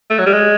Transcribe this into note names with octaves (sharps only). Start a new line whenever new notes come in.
A3
F#3
G3
G#3